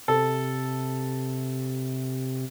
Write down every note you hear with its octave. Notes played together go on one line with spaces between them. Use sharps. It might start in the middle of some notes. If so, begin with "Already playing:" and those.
C3 A4